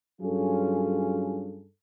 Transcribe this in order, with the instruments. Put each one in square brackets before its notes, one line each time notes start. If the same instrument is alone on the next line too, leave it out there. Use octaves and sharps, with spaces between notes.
[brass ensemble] G2 F#3 C#4 F4 G#4 A4